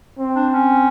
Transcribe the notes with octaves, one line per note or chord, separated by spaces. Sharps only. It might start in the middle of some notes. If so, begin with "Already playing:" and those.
C4
D4
C#4